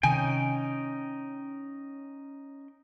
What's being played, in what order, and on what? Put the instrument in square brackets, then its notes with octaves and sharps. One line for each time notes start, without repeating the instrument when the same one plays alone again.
[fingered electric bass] C3 D#3 [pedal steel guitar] C#4 D#4 G5 [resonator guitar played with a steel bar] G#5